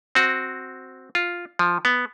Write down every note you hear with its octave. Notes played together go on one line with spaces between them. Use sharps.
C4 F#4
F4
F3
B3